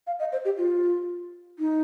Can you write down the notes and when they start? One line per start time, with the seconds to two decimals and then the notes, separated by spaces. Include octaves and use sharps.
0.07 F5
0.19 D#5
0.32 C5
0.45 G4
0.58 F4
1.59 D#4